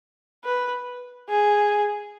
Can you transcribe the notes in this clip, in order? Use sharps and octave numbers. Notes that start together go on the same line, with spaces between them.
B4
G#4